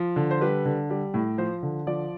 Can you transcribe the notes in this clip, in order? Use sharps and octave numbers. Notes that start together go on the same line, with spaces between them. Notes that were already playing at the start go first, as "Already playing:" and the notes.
Already playing: F3
D3
C5
G3 B4
D3
G3
A2
F3 C5
D3
F3 D5